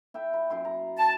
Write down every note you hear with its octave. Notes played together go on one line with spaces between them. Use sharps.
E4 E5 G5
B5
F#2 E4 C6
A#5
A5